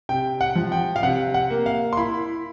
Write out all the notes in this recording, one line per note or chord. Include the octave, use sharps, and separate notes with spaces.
C3 G5
F#5
F3
G5
F5
C3 F#5
F#5
A#3
F5
C6
E4 B5